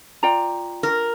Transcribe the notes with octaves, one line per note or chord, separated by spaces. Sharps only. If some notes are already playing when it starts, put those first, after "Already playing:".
F4 D5 G5 A#5
A#4